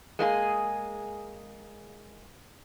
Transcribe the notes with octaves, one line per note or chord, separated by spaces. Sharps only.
G#3 A#3 E4 G#4